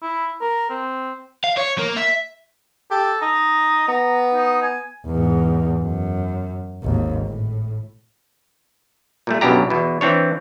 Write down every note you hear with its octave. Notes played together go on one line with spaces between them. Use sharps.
E4
A#4
C4
F5
C#5
A#3
E5
G4 A4
D#4 A#5
B3 A#5
D#4
G#5
E2 G#2
F#2
G#1 D#2
A2
A#2 G3 A3
B1 F#2 B2 D4 G4 A#5
E2 B2
E3 C4 D4 C#5